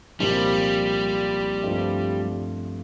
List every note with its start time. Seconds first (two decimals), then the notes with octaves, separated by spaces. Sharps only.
0.20 C2 A#2 F3 G3
1.63 G2 F3 A3 C4 F4